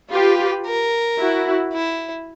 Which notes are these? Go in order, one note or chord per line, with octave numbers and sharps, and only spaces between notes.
F4 G4 B4
A#4
E4 F#4
E4